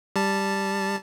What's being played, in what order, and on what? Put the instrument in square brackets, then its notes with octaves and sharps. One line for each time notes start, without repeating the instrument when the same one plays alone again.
[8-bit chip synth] G3 A5